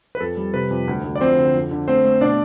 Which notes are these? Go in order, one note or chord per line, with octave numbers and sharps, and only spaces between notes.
B4
F2 A4
G3
C3 B4
F2
D2
D2
D5
F3 C4 C5
D3
F2
D3
A3 C4 C5
A3
B2 D4 D5